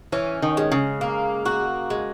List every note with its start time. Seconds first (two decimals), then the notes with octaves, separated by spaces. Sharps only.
0.12 E3 C#4
0.42 D#3
0.57 G#3
0.72 C#3
1.01 A#3
1.46 F#4
1.90 G#3